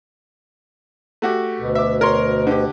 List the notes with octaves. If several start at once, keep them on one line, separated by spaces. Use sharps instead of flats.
A3 F#4 G4
D2 B2
E5 D6
A#4 C#5 C6
D3 G4